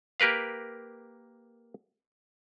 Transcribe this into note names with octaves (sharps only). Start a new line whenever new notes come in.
A#3 G4 A#4 B4 F5